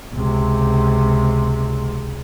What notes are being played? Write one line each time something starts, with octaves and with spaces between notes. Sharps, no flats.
C#2 C3